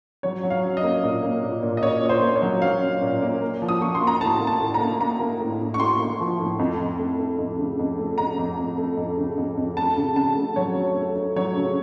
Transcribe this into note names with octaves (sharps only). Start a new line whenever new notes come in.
F#3 C#5
F#3
F5
C#4
D#5
A#3
A#2
A#3
A#2
A#2
D#5
A#2 C#5
A#2
C5
A#3
C#5
F#3
F#3 F5
C#4
A#2
A#3
A#3
F3
D#6
A#3 C#6
C6
A#3
A#5
A2 A5
A#3
A5
A2
A#5
A#3
A#3 A#5
A#3
A2
A2
C#6
A2 C6
A#3
F3
A2
F2
F2
A3
A3
F2
C#3
F2
A3
F2 A#5
F2
F2
A3
F2
C#3
F2
F2
A3 A5
C#3
C#3 A5
A3
F#3 C#5
A3
A3
A3
F#3 C#5
C#3